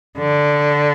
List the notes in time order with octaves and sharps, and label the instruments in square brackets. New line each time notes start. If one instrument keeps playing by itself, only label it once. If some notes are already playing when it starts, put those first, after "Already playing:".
[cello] D3